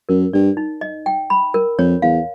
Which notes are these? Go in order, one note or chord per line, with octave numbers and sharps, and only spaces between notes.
F#2 A#4
G2 D5
D#4
D#5
G5
B5
A#4
F2 C#5
E2 F5